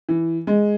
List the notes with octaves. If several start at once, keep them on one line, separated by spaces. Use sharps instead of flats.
E3
G#3